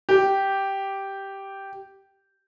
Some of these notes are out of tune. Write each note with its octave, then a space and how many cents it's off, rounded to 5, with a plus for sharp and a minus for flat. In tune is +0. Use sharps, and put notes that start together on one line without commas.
G4 -5